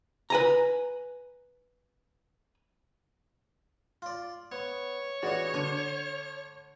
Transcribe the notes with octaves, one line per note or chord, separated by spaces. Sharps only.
B4 G#5 A#5
F4 D5
B3 C#5
E3 B3 F#4 G#4 D5
D3 G#5